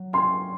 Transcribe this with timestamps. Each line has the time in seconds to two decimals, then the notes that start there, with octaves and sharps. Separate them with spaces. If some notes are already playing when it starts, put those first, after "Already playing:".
Already playing: F#3
0.13 C#4 C6